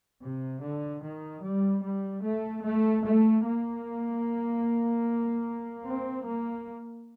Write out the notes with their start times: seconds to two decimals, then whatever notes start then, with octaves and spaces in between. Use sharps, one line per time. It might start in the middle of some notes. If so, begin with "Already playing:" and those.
0.23 C3
0.63 D3
1.03 D#3
1.44 G3
1.84 G3
2.24 A3
2.64 A3
3.05 A3
3.45 A#3
5.85 C4
6.26 A#3